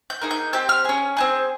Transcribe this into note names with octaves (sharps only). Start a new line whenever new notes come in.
G6
A#3 D#4 G#4
G6
C4 G4 G6
F6
C#4 G#4
C4 D#4 G#4